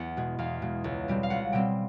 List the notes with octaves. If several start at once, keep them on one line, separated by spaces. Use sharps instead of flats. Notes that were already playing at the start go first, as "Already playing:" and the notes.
Already playing: E2 F#5
B2 G#3
E2 F5
B2 G#3
C#2
B2 G3 C4
F5
C#2 F#5
B2 G3 C4 G5